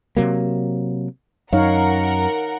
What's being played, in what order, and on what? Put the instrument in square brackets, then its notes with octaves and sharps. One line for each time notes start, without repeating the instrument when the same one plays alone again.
[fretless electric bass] C3 F#3 A#3
[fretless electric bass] F#2 [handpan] D#4 C#5 F5 [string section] A#4 F#5 A#5